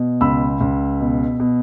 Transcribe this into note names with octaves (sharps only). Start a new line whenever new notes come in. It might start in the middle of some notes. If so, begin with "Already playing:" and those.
Already playing: B2
C#2 B5 E6
C#2
B2
B2